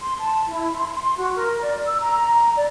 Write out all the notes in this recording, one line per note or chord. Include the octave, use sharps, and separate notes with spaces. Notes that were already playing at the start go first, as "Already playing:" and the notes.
C6
A5
E4
C6
C6
F#4
A#4
D5
E6
A#5
D5